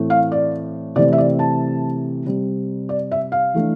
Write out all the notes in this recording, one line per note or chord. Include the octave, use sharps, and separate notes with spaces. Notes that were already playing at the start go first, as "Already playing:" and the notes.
Already playing: A2 E3 A3 C4
F5
D5
C3 E3 A3 C4 D5
E5
D5
A5
C3 G3 C4
D5
E5
F5
E3 A3 D4